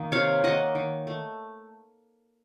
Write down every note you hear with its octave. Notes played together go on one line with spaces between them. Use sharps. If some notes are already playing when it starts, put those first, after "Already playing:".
Already playing: D#3 A#3
C3 C#5 F5
D#3 A#3 D#5 F#5
D#3
A3